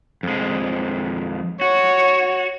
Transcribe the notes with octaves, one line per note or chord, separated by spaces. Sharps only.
F2 G#3
F#4 C#5